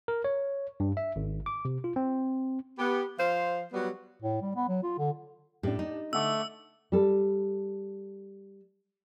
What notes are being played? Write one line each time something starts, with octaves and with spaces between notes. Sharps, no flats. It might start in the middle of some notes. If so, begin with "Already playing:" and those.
A#4
C#5
G2
E5
G#1
D6
C3
F4
C4
B3 G4
F3 C5 F5
F#3 G3 B3
A2
G3
B3
F#3
F4
D3
A2 D4 G4
D#4
D3 A3 F#5 D6 E6
G3 A4